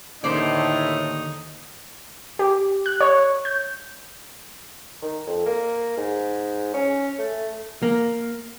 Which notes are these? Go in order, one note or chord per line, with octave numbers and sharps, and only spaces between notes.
D#2 A2 D3 D#3 D#4 C5 D5
G4
F#6
C#5
G6
D#3
F2
A#3
G#2
C#4
A3
A#3